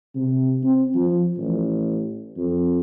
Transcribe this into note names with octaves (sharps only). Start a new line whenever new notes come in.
C3
C4
F3
A1
F2